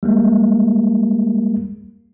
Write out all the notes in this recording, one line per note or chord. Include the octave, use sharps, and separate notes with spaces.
G3 G#3 A#3